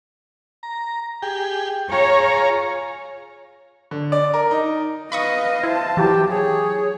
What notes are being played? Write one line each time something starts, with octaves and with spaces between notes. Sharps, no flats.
A#5
G4 G#4 G5
F4 G#4 C#5 A#5
D3
D5
A#4
D#4
B4 D#5 F5 B5 C#6 D#6
E4 C5 A5
E3 F#3 E4 G4
G#4 C#5